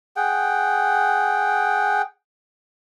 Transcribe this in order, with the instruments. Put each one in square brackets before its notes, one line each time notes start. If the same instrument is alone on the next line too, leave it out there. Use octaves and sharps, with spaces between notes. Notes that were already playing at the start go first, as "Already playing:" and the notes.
[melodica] G#4 F#5 G5